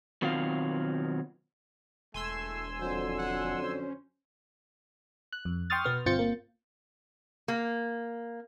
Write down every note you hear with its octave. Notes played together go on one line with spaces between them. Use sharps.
B2 D#3 F#3 C4 F4 F5
E1 A3 G#5 C6 E6
F2 D3 F#3 C5
F#5
C#4 C5
F#6
F2
G5 C6 C#6 D#6 F6 A6
B2 B3 F6
G1 C4 F4 G6 A6 C#7
A#3
A#3